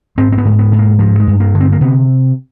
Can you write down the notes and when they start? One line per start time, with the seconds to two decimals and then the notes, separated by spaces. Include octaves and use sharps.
0.18 G#2 C4
0.32 C4
0.38 B3
0.45 G#2
0.59 B3
0.72 G#2
0.79 A#3
0.99 G2 F3
1.20 G#3
1.27 G2
1.40 A#3
1.55 D3
1.60 C4
1.72 A#3
1.81 C3 B3